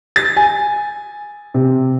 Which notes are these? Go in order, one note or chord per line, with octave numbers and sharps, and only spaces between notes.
A6
G#5
C3